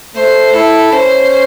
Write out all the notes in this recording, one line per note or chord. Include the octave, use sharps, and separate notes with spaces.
A3 C5
E4 A4
C#4 C5